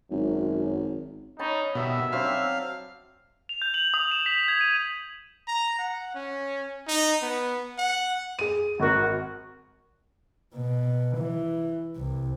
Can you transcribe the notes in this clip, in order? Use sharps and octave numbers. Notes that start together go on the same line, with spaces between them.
G#1 F#2
C#4 D#4 A5 B5
B2 D#3 G3 E5
F#3 C4 D4 F5
F7
G6
F#7
D#6
E7
B6
G#6
D#7
A#5
F#5
C#4
D#4
B3
F#5
G#4 D#7
G#1 F#4 A#4
B2
E3
C2